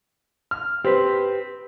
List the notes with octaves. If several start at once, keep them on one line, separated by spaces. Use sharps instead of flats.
F6
C4 G4 B4